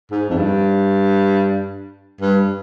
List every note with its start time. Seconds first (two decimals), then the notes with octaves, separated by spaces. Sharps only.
0.11 G#2
0.30 F2
0.37 G2
2.21 G2